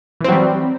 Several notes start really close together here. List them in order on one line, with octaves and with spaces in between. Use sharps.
E3 C4 F#3 G3